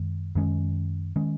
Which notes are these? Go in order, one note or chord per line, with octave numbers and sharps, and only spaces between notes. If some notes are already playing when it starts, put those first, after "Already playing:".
Already playing: F#2 D#3 G#3
F#2 D#3 G#3 C#4
D#3 G#3 C#4